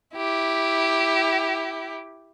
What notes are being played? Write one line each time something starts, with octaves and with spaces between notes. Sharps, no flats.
E4 G4